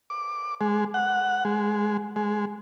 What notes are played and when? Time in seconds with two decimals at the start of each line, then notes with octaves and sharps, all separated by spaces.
0.10 D6
0.61 G#3
0.94 F#5
1.45 G#3
2.16 G#3